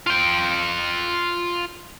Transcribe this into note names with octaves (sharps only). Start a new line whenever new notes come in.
F4 G5